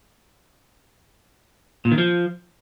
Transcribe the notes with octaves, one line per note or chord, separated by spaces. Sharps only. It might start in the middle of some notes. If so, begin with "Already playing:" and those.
A#2
D#3
F3